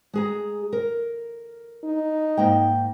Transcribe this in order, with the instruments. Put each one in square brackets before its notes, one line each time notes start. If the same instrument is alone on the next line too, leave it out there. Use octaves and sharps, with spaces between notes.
[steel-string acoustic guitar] G#3 G#4 A#5
A#4
[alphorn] D#4
[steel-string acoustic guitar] G#2 A#3 G5